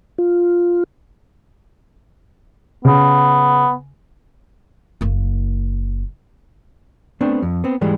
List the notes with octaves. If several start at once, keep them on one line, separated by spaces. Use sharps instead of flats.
F4
C#3 B3
F#1 A#3
A3 B3 C4 D4
F2
B3 C4
G#2 E3 G3 G#3